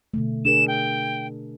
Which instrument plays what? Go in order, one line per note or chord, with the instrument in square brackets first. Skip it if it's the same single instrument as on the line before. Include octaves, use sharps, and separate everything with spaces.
[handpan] B2 D3 A3
[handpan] D4 G#4 A#4 [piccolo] E7
[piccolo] G5